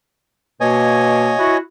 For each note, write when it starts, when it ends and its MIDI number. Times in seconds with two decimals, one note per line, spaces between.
0.61 1.32 47
0.61 1.32 58
0.61 1.57 73
0.61 1.57 75
0.61 1.57 80
1.38 1.56 64
1.38 1.56 66